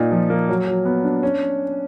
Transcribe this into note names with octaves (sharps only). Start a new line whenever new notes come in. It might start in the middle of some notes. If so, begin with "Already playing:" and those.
Already playing: A#2 D#4
F3
A#3
F#3
F#3
B3
D4
C#4